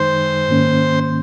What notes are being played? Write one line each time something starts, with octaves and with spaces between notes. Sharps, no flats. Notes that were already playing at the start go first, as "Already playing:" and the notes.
Already playing: F#2 D#3 G#3 D#4 C5
G#2 D#3 A#3 C#4